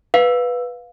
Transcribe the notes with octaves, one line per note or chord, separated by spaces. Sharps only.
B4 F5